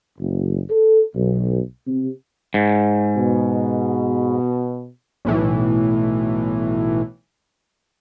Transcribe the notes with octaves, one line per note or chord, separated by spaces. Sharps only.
F#1
A4
B1
C3
G#2
B2
B1 A2 E3